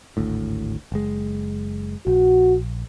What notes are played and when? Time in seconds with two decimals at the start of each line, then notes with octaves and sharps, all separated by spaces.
0.17 G#1 D2 A2
0.92 F#1 G#3
2.07 A#1 F#4